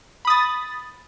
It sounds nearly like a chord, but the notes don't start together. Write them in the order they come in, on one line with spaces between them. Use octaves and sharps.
B5 D#6 A6